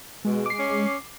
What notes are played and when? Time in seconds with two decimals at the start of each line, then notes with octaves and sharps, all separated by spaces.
0.25 B2 G#3
0.46 D6 C7
0.59 C#4